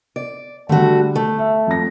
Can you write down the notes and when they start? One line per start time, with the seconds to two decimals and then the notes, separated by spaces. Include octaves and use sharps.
0.16 D5
0.69 D3 G3 A3 F#4
1.15 A3
1.39 E5
1.67 F2 A#6